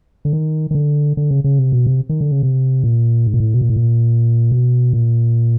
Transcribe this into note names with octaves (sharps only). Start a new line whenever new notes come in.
D3
D#3
D#3
D3
D3
C#3
C#3
C3
B2
C3
D#3
D3
C#3
C3
A#2
G#2
A#2
A2
B2
A#2
A2
A#2
B2
A#2